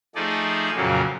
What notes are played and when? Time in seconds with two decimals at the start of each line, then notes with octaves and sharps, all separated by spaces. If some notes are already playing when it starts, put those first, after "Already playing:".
0.15 F3 A3 D#4 G#4 D5
0.76 F2 A#2 C#3 F#3 A#3